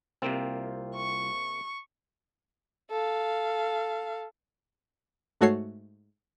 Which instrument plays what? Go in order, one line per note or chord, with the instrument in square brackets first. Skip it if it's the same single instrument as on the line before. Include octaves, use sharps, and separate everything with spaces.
[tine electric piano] C2 F4 [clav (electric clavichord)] C3 A#3 C4
[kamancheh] C#6
A4 F5
[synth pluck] G#2 A3 F#4 A4 C#5 C7